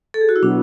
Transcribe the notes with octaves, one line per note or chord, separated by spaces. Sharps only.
A4
G#4
F#4
E4
B2 F#3 B3 D4